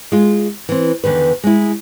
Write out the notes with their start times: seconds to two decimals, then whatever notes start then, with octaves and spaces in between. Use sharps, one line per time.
0.12 G#3 F4
0.69 E3 C4
1.04 E2 D3 D#3 B4
1.44 G#3 E4